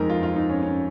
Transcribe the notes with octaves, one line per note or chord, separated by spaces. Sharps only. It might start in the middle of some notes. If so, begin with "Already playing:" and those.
Already playing: F2 F3 G#3 D#4 A#4
F4
F4
D#4
C#4
C#4